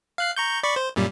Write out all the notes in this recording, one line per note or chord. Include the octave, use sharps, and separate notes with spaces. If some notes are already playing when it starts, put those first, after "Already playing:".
F5 F#6 C7
A#5 C#6 G6
D5 B5 C#6
C5
F#2 A#2 G3